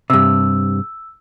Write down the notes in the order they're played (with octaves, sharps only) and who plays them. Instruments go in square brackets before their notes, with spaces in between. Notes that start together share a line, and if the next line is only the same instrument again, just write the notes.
[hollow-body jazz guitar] G2 C3 [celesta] E6